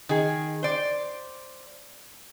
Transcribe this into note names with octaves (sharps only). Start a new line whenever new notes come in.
D#3 G#4
C5 D5